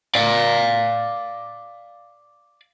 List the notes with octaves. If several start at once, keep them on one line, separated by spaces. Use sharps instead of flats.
D5 F5